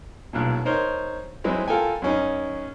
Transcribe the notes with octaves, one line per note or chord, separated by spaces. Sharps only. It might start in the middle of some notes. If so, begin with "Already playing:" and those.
B1 G2 A#2
D#4 A#4 C5 C#5
F#3 G#3 C4 E4
F4 A4 A#4 G5 G#5
F#2 C#4 D#4